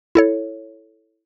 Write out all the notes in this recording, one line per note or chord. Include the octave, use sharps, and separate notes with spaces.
E4 A4 C#5